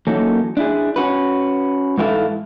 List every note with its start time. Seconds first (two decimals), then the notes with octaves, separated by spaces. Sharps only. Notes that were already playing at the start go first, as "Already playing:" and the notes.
0.07 E3 F#3 A#3 C#4 D#4 A4
0.57 D4 E4 G#4
0.96 C#4 F#4 B4
1.98 G#2 E3 E4 G4 A4 F5